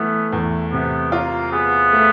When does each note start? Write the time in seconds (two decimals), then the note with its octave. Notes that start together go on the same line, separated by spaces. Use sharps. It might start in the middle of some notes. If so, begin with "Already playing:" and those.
Already playing: E3 A3 B3
0.32 E2
0.72 C3 B3
1.12 A#3 F4
1.52 B3 G#4
1.93 A3